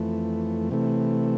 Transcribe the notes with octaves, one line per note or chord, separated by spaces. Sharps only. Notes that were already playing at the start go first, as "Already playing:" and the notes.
Already playing: F2 E3 A3
C3 E3 A3